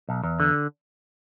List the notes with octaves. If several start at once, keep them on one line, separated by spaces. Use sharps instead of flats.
B1
E2
D3